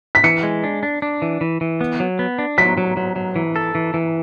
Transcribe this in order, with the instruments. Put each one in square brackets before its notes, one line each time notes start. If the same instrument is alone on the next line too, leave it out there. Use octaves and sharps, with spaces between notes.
[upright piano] B6
[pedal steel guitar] E3 [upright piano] C#7
[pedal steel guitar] G#3
D4
D4
D4
E3
E3
E3
B3
F#3
B3
D4
[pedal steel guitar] F#3 [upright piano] B6
[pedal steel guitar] F#3
F#3
F#3
E3
A4
E3
E3